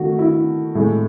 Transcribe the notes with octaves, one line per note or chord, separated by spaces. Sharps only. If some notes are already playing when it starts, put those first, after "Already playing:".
Already playing: D#3 A3 F#4
E4
A2 G#3